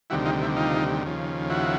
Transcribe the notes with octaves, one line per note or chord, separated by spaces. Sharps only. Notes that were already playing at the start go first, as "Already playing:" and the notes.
D2 C3 D#3 G3 E4 F#4
D#4 F4
E4
D#4 F4
D#2 C#3 F3
E4 F#4